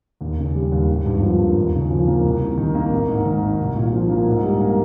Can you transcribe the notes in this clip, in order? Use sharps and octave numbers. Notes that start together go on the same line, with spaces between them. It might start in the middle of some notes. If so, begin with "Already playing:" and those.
D#2
C#3
G3
D#2
G#1
G2
F3
A#3
D#2
C#3
F3
A#3
C2
C3
D#3
A#3
G#1
G#2
D#3
G#1
C2
A#2
F3
A#3
G#2
G3
A#3